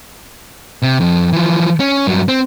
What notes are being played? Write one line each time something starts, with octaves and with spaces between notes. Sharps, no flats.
C3
F2
E3 F3
C#4
G2 F#3
C4